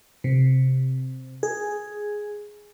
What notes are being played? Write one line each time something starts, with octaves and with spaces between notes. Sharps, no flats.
C3
G#4